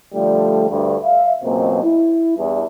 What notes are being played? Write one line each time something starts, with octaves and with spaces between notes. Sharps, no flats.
D3 F3 G3 A3
D2 G2
E5 F5
C#2 F#2 B2 F#3 A#3 C4
E4
E2 G2